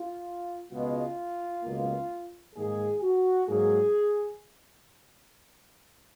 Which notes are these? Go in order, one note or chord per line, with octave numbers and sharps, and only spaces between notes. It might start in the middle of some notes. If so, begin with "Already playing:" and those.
Already playing: F4
C#2 B2 G#3 B3 F4
C#2 B2 A#3
G#2 D#3 A#3 G#4
F#4
G#2 F#3 A#3 G#4